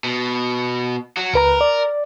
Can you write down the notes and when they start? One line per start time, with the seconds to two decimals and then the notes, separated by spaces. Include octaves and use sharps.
0.04 B2
1.17 F#3 F#4
1.34 C#2 A#4 B4 A#5
1.61 D5